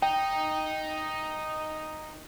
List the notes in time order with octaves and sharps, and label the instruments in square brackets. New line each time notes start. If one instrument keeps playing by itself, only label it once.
[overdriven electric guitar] D#4 [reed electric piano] G5